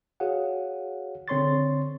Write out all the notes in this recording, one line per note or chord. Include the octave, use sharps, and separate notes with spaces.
F#4 G#4 C#5 F5 F#5
D3 C4 C#5 C6 C#6 A6